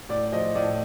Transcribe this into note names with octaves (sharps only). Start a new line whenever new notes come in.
A2 D5
F3 D#5
A2 D5